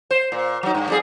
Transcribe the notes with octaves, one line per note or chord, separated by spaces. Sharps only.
C5
A#2
F#3 D#4
G2
F2 G3 G#4